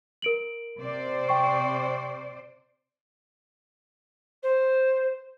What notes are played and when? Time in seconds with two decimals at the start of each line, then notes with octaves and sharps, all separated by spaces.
0.22 A#4 D7 F#7
0.80 C3 C5 D5
1.29 G5 C#6
4.43 C5